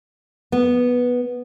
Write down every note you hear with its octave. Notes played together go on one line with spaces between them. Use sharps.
B3